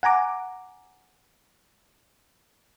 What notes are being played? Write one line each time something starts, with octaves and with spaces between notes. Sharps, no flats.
F#5 G#5 A#5 D6